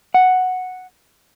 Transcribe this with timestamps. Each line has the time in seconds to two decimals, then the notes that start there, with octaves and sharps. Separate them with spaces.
0.14 F#5